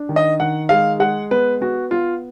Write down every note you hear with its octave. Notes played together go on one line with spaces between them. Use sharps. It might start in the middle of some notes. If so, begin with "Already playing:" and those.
Already playing: D4
D#3
D#5
D#3 F#5
G#3 F5
G#3 F#5
B3 B4
B3 F#4
B3 F4